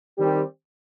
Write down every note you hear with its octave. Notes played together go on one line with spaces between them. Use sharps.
D#3 G3 C4 G4